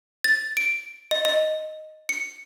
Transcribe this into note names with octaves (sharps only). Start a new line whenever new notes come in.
A6
D7
D#5
D#5
C#7